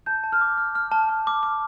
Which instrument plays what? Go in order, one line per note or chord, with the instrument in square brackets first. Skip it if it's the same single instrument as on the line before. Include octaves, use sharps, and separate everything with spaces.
[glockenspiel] A5 [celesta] G6
[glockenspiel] A5
[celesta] F6
[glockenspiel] D6
F6
F6
A5
A5
D6
D6